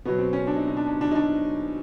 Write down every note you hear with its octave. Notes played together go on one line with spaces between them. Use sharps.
B2 F#3 B3
C4
C#4
D4
D#4
D#4
D4
D4
D4
D#4
D4